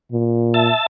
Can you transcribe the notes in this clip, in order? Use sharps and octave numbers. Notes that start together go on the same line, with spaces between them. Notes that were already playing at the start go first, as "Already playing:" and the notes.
A#2
E5 A5